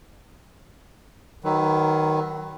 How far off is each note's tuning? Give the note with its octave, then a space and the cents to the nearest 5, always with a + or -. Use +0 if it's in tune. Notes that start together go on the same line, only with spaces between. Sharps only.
D#3 +0 F#3 +25 B4 +15